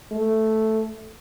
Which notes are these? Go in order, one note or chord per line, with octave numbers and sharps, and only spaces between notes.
A3